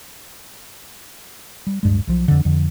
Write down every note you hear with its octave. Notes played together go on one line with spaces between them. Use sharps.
G3
D1 G2 G#3
B1 F3
F2 D3
F2 D3